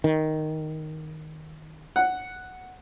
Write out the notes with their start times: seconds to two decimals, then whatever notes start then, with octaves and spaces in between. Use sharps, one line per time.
0.04 D#3
1.96 F#5